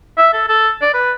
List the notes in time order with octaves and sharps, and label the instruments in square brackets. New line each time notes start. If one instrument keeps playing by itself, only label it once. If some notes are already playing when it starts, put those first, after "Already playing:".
[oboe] E5
A4
A4
D5
B4